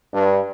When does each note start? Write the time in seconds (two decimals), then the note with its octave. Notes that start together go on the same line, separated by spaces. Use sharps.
0.14 G2